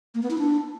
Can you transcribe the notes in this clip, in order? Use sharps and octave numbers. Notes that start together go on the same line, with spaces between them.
A#3
B3
E4
D4